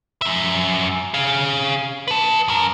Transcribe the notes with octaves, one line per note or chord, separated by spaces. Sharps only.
F#2 E5
G#4 F5
B4 A5
F#2 A#4